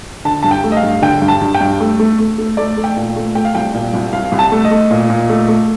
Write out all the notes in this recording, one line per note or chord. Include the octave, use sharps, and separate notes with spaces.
D3 A5
G2 A5
G5
A3
D#5
F5
G2
D3 G5
G2
A5
G2
G5
G2
A3
A3
A3
A3
A3 D5
A3
G5
A#2
A3
A3 G5
F5
C2 G5
A#2
C2
C2 F5
C2
A5
A3
D#5
A3
A#2
A#2
A3
A3